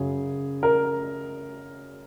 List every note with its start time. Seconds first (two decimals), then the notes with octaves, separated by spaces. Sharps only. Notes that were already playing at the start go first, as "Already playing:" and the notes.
Already playing: F#2 C#3 F#3 G#4
0.63 A#4